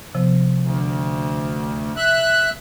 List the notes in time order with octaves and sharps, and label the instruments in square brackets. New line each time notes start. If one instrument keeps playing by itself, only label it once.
[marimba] C3 F3 B3
[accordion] D2
E5 F#6